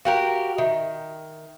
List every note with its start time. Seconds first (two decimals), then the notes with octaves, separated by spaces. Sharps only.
0.05 F#4 G4 A#4 F5
0.58 D#3 E5